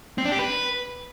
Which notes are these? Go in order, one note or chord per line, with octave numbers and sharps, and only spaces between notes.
C4
D4
G4
B4